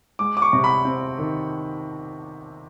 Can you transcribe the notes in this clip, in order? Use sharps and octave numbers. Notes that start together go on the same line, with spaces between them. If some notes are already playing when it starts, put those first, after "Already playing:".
G#3 D6
D6
C#6
C3
B5
C4
D#3